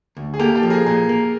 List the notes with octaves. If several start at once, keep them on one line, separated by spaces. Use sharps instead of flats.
D2
G#4
A#3 G4 A4
G4 A4
F3
G#4 A#4
A#2 G#4 A#4
A#3